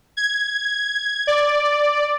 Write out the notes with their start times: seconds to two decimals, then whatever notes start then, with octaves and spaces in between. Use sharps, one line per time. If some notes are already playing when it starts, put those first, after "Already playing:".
0.17 G#6
1.27 D5